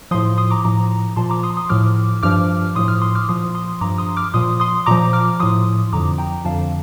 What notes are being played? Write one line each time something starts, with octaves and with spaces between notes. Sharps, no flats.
A2 F3 C6 D#6
C6 D#6
A#5 D6
A2 F3 A#5 D6
A#2 F3 A5 C6
A#5 D6
C6 D#6
C6 D#6
A2 F3 D6 F6
G2 F3 D6 F6
A2 F3 C6 D#6
D6 F6
C6 D#6
D6 F6
A#2 F3 C6 D#6
C6 D#6
G2 F3 A#5 D6
C6 D#6
D6 F6
A#2 F3 C6 D#6
C6 D#6
A#2 F3 A#5 D6
D6 F6
A2 F3 C6 D#6
F2 D3 F3 A#5 D6
G5 A#5
F2 D3 F3 F5 A5